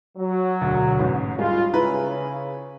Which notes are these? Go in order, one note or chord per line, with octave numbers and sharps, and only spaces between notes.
F#3
E1 D2
A1 G#2
G3 G#3 F4
C#3 E4 B4 A#5